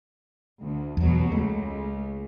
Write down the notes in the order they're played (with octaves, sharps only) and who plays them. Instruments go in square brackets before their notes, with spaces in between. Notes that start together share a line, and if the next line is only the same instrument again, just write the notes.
[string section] D2
[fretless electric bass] E2 [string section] B2 F#3
[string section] C#2 [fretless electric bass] A3